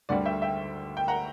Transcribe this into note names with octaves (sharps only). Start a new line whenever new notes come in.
D2 D3 G3 D5 F#5
E5 G5
E5 G5
G5
F#5 A#5